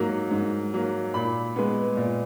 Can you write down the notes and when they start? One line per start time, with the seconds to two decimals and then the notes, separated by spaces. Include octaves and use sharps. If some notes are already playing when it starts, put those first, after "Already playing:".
Already playing: G#2 F#3 A#3
0.31 G#2
0.74 F#3 A#3
1.14 A#2 B5
1.56 G#3 B3
1.97 A#2